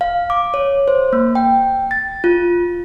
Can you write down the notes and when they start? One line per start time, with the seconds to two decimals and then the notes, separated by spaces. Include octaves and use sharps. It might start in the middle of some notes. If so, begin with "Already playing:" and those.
0.01 F5
0.30 D6
0.54 C#5
0.88 C5
1.13 A#3
1.35 G5
1.91 A6
2.24 F4